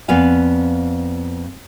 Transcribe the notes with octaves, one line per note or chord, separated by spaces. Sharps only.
F2 B3 D5 F5 G#5